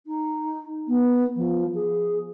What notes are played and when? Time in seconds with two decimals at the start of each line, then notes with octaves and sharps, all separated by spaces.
0.06 D#4
0.87 B3
1.36 F3
1.74 G#4